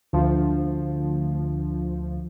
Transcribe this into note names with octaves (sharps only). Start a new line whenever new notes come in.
D2 F3